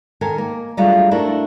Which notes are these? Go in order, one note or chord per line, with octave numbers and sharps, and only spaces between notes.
D#3 A4 A#4 G#5
A#3
F#3 G3 A3 D4 F4 G#4
A3 D4 E4 F#4 A#4